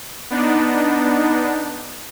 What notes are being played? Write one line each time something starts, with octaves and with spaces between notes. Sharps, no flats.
B3 D4 D#4